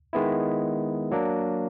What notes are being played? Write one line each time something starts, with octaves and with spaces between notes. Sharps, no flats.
D#3 G#3 B3 E4
F#3 A#3 D4